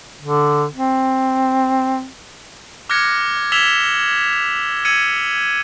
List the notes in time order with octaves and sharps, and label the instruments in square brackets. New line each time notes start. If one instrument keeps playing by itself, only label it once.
[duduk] D3
C4
[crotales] D6 F6 F#6 G#6 A#6 C#7
E6 G#6 B6 E7 F7 G7
E6 G#6 C#7 D#7